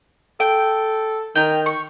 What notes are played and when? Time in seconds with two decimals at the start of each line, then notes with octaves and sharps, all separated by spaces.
0.40 A4 G5
1.36 D#3 G5 A#5
1.66 C#6